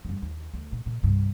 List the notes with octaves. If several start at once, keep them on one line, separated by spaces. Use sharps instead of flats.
F#2 G3
D#2
D2
A#2
A#2
C2 G2